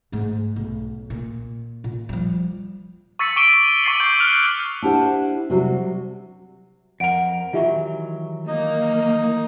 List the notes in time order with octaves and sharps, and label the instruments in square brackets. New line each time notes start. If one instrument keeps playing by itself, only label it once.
[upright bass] G#2 A3
B1
A#2
A#2
F3 G3
[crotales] C#6 E6 A6 B6 C#7
C#6 D6 D7 D#7 G7
C#6 E6 A6 C7 D#7 F#7
C#6 G6
F6 F#6 F7
[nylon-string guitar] D4 E4 G4 C5 F#5
C3 F#3 G3 F#4
[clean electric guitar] F2 A#4 [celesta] F#5 D7
[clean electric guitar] D#3 E3 F#3 [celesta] F4 G4 E5
[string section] A#3 [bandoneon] D#4 D#5